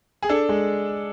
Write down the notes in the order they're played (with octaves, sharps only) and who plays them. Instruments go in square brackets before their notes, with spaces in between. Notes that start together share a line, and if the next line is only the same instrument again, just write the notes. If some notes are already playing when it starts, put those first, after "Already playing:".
[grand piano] G#4
D4 A4
G#3